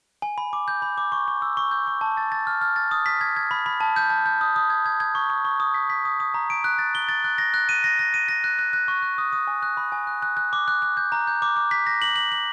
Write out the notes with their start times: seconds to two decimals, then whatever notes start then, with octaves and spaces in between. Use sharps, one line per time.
0.22 G#5
0.38 B5
0.53 D6
0.68 G6
0.82 B5
0.98 D6
1.12 C#6
1.28 C#6
1.42 E6
1.57 C#6
1.71 G6
1.87 C#6
2.01 A5
2.17 A6
2.32 A6
2.47 F6
2.61 F6
2.76 A6
2.91 D#6
3.06 B6
3.21 G#6
3.36 G#6
3.51 B5
3.66 B5
3.80 A5
3.96 G6
4.10 A5
4.26 G6
4.41 D#6
4.56 D#6
4.70 G#6
4.86 G#6
5.00 G#6
5.15 C#6
5.30 C#6
5.45 C#6
5.60 D#6
5.74 B6
5.90 B6
6.05 D#6
6.20 D#6
6.34 A#5
6.50 D7
6.64 F#6
6.79 A6
6.95 G7
7.08 A6
7.24 F#6
7.38 A#6
7.54 F#6
7.69 D#7
7.84 A#6
7.99 A#6
8.14 D#7
8.29 A#6
8.44 F#6
8.59 F#6
8.73 F#6
8.88 C#6
9.02 F#6
9.18 D#6
9.33 D#6
9.47 G#5
9.62 F#6
9.77 B5
9.92 G#5
10.07 F#6
10.22 F#6
10.37 F#6
10.53 D6
10.68 F#6
10.82 F#6
10.97 G6
11.12 A#5
11.27 G6
11.42 D6
11.57 D6
11.71 B6
11.87 A#6
12.02 F#7
12.16 F#7
12.32 F#7